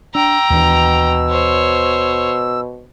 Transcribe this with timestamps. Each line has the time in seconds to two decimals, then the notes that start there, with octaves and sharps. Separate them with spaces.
0.15 D4 G5 A#5 E6
0.50 D#2 B2 E3 D4
1.30 C5 C#5